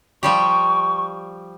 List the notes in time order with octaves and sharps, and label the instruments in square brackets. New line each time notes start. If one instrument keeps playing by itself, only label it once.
[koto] F3 G3 G4 [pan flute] C#6